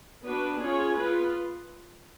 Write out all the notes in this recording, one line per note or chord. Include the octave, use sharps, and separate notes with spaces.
B3 D4 F#4 B4
C#4 F4 G#4 C#5
B3 F4 B4